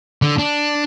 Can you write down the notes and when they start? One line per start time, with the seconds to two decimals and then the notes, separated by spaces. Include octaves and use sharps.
0.22 D3
0.38 D4